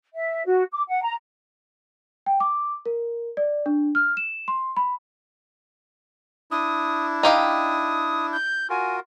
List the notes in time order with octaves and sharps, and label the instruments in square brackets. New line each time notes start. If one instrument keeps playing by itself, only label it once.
[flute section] E5
F#4
D6
F#5
A#5
[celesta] G5
D6
A#4
D5
D4
F6
E7
C6
B5
[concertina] D4 E4 [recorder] D#6
[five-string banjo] D#4 G4 F5 [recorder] D#6
[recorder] G6
[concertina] F4 F#4 A#4 [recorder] G#5